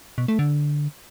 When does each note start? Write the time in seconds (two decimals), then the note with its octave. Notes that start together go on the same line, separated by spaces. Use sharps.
0.18 B2
0.28 A3
0.39 D3